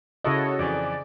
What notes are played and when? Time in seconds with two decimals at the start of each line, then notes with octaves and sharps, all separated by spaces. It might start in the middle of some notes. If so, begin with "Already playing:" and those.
0.25 C#3 E4 F#4 A4 C#5 D#5
0.59 F2 E3 D5